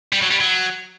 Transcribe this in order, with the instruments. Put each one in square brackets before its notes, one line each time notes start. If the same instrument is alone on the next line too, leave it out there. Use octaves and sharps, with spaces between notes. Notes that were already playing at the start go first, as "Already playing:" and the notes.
[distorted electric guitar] G3
F#3
G3
F#3